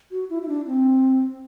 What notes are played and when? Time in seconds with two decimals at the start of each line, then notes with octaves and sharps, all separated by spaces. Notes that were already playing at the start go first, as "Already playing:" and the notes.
0.11 F#4
0.30 E4
0.42 E4
0.48 D4
0.67 C4